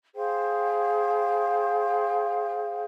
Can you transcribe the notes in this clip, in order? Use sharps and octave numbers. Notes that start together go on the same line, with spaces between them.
G#4 C5 F5 G5